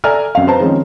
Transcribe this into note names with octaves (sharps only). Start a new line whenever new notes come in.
A4 D5 E5 G#5 A#5 F6
F#2 C4 F5
B4 C5 A5 A#5
D#3 F3 G#3 C4 C#4 D#4